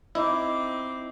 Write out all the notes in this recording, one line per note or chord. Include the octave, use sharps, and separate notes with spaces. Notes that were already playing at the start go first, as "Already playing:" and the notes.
C4 D#4 E4 D6